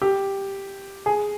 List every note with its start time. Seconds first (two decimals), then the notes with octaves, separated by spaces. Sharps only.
0.02 G4
1.06 G#4